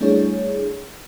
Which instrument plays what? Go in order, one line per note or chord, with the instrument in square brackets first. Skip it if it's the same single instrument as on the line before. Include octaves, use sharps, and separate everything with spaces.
[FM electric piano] G3 A3 D4 E4 G#4 C#5